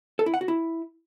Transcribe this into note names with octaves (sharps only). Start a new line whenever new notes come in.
A4
E4
F#5
F#4
E4